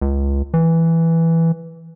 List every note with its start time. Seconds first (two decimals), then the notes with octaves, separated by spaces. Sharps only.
0.02 C#2
0.54 E3